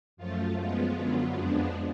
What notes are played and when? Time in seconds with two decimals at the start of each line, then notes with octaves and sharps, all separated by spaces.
0.17 F#2 F3 A3 F4
0.56 F#2 F3 G#3 B3 F4
0.95 F#2 D3 F#3 B3 F4
1.34 F2 F3 G#3 B3 D4